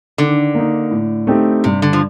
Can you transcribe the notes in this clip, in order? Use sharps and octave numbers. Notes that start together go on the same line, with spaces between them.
D3 D#3
A#3 D#4
A2
A3 C4 D#4 G4
G2 C3
D3
F3